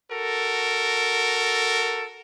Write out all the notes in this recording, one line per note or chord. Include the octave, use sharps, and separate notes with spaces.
F#4 A4 A#4